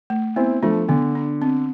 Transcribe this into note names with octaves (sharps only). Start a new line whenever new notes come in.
A3
B3 C4 E4
F3 A3 D4
D3 B3
D4
C4